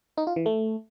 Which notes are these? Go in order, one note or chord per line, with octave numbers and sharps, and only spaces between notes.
D#4
F4
E3
A3